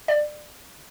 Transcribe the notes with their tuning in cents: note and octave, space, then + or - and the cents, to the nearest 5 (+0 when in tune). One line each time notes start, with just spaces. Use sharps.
D5 +25